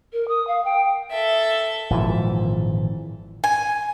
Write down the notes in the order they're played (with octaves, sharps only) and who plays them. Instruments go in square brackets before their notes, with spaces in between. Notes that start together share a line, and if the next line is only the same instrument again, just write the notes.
[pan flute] A#4
D#6
F5
G5
[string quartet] A4 E5
[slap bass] G#1 A#2 E3 F3
[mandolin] G#5